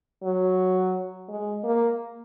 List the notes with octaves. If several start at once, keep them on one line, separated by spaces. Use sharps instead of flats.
F#3
G#3
A#3